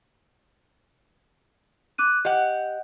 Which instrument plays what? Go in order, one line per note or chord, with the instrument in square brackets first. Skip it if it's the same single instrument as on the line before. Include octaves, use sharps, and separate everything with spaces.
[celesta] D6 F#6 D#7
[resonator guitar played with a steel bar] G4 F#5 [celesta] D#5